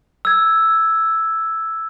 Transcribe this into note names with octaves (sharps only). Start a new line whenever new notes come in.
E6 G#6